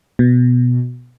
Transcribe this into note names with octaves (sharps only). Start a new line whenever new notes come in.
B2